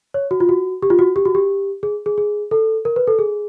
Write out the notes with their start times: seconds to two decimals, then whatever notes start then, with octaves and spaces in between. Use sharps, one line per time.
0.14 C#5
0.31 F#4
0.40 F4
0.49 F#4
0.82 G4
0.90 F4
0.99 F#4
1.16 G4
1.25 F#4
1.35 G4
1.83 G#4
2.06 G#4
2.18 G#4
2.51 A4
2.85 A#4
2.96 B4
3.07 A4
3.19 G#4